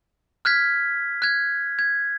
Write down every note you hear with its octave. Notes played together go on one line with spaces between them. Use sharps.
F6 F#6 G#6 B6
F#6 G#6
G#6